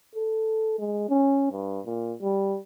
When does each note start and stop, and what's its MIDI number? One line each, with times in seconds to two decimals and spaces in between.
0.15 0.75 69
0.79 1.08 56
1.09 1.50 61
1.52 1.80 43
1.86 2.14 46
2.22 2.58 55